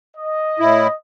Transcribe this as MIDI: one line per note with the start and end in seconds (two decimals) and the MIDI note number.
0.16 0.94 75
0.60 0.88 45
0.60 0.88 64